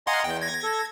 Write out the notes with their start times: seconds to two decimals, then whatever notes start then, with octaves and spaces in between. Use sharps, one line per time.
0.07 D#5 F5 F#5 G#5 A#5 C6
0.24 E2 G5
0.41 G#6 A#6
0.63 A4